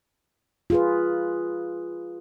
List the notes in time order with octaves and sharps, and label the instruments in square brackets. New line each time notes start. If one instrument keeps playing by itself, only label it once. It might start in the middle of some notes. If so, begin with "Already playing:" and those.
[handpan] F4 G#4 B4